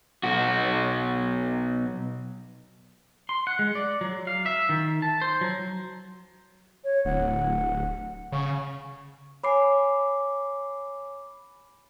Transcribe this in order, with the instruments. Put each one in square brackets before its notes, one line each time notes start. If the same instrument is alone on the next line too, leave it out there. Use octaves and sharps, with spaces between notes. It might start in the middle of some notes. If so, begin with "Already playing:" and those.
[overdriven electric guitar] B1 F#4
[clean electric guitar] C6
F#5
G#3
D5
F#3
F5
E5
D#3
A5
C5
F#3
[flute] C#5
[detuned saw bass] D1 [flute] F#5
[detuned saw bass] C#3 [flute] C#6
[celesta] C#5 G#5 [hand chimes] B5 D6 C7